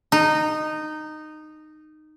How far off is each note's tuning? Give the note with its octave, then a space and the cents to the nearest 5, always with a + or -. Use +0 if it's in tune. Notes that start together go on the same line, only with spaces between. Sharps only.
D#4 -15